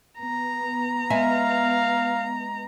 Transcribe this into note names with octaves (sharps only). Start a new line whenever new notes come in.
B3 A#5
G#3 E5 F5 G#5